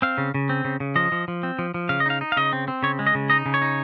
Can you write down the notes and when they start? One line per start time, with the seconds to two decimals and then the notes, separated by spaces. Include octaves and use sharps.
0.02 C4 F5
0.18 C#3
0.34 C#3
0.49 C4
0.65 C#3
0.80 C#3
0.96 F3 D#5
1.12 F3
1.28 F3
1.43 C4
1.59 F3
1.74 F3
1.89 C#3 F5
2.00 D#5
2.06 D#4 F5
2.21 D#4
2.32 F5
2.37 C#3 D#5
2.53 C4
2.68 C4
2.83 C#3 C#5
2.99 G#3
3.07 D#5
3.15 C#3
3.30 D#4 D#5
3.46 C#3
3.54 C#5
3.62 D#4